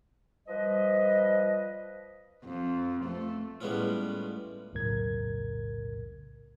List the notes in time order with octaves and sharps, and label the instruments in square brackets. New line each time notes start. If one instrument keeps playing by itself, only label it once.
[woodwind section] F3 G3 B4 D#5
[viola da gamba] F2
A3
[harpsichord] A2 G3 G#3 B3 C#4 F4
[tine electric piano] B1 E2 A2 C#3 A#4 G#6